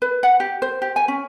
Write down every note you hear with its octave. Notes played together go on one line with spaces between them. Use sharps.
B4
F#5
G4
C5
G4
G#5
C#4